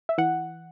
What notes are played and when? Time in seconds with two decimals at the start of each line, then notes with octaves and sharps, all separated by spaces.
0.09 E5
0.18 E3 F#5